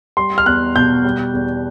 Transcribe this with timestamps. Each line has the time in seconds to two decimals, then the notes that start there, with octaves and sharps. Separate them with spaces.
0.17 G3 C6
0.38 F6
0.46 E2 F#6
0.75 B2 G6
1.05 G3
1.34 E2